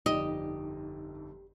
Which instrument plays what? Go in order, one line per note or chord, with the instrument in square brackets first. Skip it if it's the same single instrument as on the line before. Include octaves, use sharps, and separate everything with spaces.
[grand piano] G1 F2 [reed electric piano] D#4 [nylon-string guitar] G4 [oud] D#5